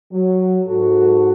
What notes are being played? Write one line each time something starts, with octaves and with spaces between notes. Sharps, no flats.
F#3
G#2 F#4 A4